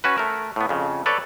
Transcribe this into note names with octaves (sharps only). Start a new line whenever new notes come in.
C#4 F#4 B4
A3 A#4
A2 B3
F2 C#3
A4 B4 C#5 D5